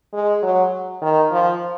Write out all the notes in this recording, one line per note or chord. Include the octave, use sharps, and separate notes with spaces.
G#3
F#3
D#3
F3